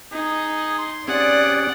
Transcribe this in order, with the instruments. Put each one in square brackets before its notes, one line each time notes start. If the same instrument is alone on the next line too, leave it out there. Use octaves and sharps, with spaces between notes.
[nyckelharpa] D#4 [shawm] G#4
[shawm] C6
[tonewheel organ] C4 C#4 G4 [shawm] G#4 [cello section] D5 [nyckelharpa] F#5